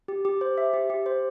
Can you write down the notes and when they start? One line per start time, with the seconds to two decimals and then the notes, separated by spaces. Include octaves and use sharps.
0.08 G4
0.25 G4
0.41 C5
0.58 E5
0.73 G4
0.90 G4
1.06 C5